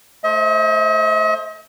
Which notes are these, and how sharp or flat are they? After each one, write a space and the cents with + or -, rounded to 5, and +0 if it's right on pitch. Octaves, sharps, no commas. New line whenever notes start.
A3 +0 C5 +20 D#5 +45